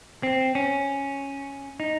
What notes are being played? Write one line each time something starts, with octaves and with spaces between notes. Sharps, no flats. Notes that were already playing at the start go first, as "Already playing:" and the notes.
C4
C#4
D#4